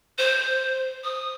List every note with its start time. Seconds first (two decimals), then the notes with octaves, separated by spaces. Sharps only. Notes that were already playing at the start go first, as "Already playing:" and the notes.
0.18 C5
1.04 D#6